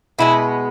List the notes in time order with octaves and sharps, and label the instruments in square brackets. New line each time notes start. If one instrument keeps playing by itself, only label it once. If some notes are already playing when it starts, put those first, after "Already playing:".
[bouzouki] B2 G#3 B3 [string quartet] E4